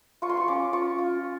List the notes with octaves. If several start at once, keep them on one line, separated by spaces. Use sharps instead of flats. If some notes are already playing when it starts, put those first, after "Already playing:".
F4 C#6
C6
C#6
C#4 D6
F4 C#6
F4